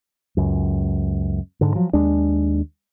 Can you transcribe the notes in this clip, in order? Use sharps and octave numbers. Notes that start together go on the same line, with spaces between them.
C#2 F#2
G#2 D3
F3 F#3
D#2 G#3 D4